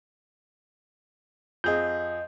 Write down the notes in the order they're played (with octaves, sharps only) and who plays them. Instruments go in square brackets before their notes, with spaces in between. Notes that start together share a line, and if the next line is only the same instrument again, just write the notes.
[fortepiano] F2 G#4 [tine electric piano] D#5 G6